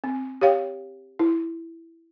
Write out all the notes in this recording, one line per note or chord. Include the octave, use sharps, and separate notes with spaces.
C4
G4 C#5 F5 G5
E4